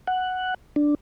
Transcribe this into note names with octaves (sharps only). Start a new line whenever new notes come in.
F#5
D4